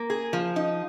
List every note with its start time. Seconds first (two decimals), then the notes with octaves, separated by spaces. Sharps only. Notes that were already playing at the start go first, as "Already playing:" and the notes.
Already playing: A#3
0.10 G#4
0.33 F3
0.56 D#4